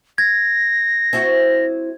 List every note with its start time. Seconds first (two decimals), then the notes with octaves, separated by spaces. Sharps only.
0.18 G#6 A#6
1.13 C4 E4 F#4